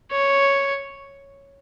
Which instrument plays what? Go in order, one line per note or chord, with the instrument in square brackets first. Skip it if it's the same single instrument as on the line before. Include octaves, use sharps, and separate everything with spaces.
[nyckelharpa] C#5